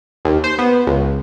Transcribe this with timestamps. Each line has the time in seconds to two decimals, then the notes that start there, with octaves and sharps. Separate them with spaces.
0.25 D#2
0.44 C5
0.58 B3
0.87 C#2